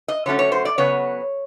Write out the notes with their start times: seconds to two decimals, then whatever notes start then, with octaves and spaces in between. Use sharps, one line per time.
0.08 D#5
0.26 D3 F#3 A3 C#4 C#5
0.39 C#5
0.52 C5
0.65 D5
0.78 C#3 F#3 B3 C#5